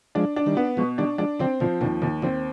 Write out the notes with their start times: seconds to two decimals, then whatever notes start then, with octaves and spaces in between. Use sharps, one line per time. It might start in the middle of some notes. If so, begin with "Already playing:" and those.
0.15 F3 G#3 D4
0.36 D4
0.46 D#3 G3
0.57 B3
0.77 B2 F3 G#3
0.98 D#3 G3 D4
1.18 F3 G#3 D4
1.39 D3 F3 C4
1.60 B2 D3 F3
1.81 D#2 B2 D3
2.02 D#2 C3 D#3
2.22 D3 F3 C4